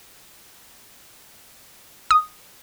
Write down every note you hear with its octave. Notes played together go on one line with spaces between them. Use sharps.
D#6